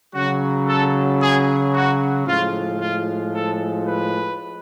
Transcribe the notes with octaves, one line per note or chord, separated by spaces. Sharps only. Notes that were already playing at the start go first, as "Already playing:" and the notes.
C#3 F#3 F#4
A4
G#4
F#4
A2 F3 G#3 F4
F4
A4
B4